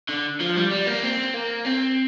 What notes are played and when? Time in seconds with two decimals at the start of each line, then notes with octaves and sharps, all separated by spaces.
0.09 D3
0.40 F3
0.56 G3
0.71 G3
0.86 A#3
1.03 C4
1.34 A#3
1.65 C4